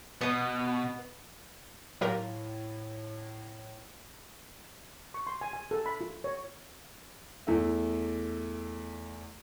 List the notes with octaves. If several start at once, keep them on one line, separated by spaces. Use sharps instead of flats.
B2 B3 D#5
A2 F#3 F4 G4 A#4
C#6
C6
G#5
G#5
A4
B5
F4
C#5
E2 A3 E5